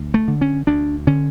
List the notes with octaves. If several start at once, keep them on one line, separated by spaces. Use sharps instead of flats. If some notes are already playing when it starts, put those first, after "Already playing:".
Already playing: D2
A3
D3
C#4
D2 D4
D3 C#4